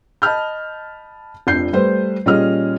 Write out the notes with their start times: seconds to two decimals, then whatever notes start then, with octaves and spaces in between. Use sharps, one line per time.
0.22 D#5 A5 B5 F6 G6
1.47 F1 F2 D4 G6 C7
1.73 G3 A3 B4 C5
2.26 A#2 G3 C#4 G#4 D#5 F6